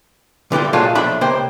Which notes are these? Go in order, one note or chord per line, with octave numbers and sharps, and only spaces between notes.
D3 E3 G3 F4
A#2 F#3 G#3 A3 D4 F4
B1 F3 A3 D4 E5 B5
C#2 C3 A#3 C5 G5